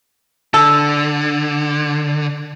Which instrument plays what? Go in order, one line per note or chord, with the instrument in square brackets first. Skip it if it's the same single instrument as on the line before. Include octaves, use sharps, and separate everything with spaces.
[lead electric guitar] D3 [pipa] A4